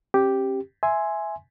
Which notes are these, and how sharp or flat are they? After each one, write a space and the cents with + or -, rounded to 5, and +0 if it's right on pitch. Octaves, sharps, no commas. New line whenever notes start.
C#4 -45 G4 +0
E5 +0 G#5 +5 C6 +0